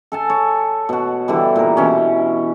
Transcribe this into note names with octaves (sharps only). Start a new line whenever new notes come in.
A4 G#5 A5
C#5
B2 F#4
D3 E3 G3
A#2 A#4
B2 E3 C#4